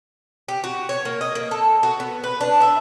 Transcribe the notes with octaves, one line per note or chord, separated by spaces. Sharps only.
G4
F#4
C#5
A#3
D#5
A#3
A4
F#4
B3
B4
D4
E5